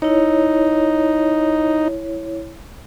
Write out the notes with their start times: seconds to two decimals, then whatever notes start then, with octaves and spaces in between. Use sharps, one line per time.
0.02 D#4 E4 C#5